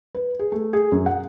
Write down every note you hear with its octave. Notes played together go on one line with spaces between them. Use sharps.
B4
G#4
A3
G#4
F#2
F#5